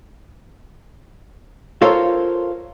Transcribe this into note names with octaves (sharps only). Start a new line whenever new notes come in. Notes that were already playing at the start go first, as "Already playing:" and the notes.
F4 A4 A#4 C5 C#5 F5